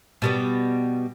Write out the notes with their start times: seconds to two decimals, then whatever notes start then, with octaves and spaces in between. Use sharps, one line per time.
0.22 B2 G3 B3